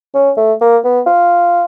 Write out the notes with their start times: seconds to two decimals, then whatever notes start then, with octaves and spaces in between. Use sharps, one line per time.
0.15 C#4
0.37 A3
0.61 A#3
0.84 B3
1.07 F4